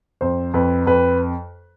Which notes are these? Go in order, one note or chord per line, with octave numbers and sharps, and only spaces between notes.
F2 C5
F2 B4
F2 B4